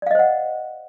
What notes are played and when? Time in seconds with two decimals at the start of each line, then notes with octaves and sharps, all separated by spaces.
0.02 D5
0.06 F5
0.11 D#5
0.15 C5
0.19 F#5